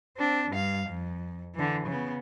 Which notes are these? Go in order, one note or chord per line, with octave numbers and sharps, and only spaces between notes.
C4 D4
G2 F5
F2
D3 E3
C#3 B3